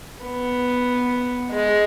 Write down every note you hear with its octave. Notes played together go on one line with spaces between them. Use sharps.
B3
G#3